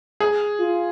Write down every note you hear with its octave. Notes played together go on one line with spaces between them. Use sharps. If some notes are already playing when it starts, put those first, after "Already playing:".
G#4
F4